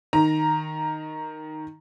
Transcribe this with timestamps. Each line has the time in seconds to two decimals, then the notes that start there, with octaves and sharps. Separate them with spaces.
0.13 D#3 A#5